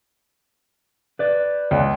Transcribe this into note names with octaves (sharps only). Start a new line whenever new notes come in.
B4 D5
C#2